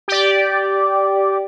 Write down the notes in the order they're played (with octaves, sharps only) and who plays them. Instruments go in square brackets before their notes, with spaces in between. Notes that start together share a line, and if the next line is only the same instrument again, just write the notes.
[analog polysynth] G4 D5